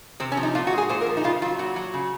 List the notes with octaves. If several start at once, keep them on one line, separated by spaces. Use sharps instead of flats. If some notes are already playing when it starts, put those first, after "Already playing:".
C3 C4
C#4
F3
D#4
A#2 F4
F#4
G#3 G#4
A#2 C5
A#4
F3
D#4
C#3 F4
F#3 F4
A#2 F#4
F#3
C#3